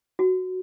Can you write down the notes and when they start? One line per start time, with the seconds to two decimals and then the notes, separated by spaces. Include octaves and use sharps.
0.19 F#4